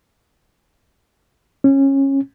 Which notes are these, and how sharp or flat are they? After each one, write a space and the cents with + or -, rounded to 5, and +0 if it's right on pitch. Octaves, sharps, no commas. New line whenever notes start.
C#4 -20